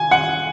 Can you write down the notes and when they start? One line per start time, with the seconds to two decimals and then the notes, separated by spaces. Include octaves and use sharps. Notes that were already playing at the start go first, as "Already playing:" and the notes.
Already playing: G#5
0.11 F#5